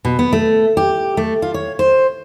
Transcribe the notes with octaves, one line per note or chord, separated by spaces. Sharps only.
B2
B3
A3
G4
A3
F4
C#5
C5